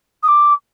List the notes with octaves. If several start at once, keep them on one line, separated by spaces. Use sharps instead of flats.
D#6
D6